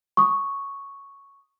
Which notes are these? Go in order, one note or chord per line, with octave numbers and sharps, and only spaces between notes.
C#6 D#6